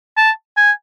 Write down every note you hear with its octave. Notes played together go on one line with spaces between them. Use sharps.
A5
G#5